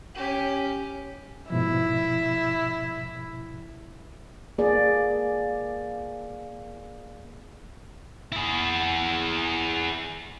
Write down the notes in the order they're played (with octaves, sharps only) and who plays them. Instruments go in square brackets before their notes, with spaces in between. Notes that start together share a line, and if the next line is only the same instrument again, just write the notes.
[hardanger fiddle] C#4 G4
[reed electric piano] G#2 B2 F3 [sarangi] E4
[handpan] A#3 G#4 D5
[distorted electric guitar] E4 G#4